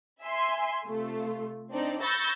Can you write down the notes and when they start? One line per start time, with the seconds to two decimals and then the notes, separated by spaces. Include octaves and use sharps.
0.22 E5 G#5 C6
0.85 C3 A3 F4
1.71 C4 D4 D#4 D5
2.01 B5 C#6 E6 G6 A6 A#6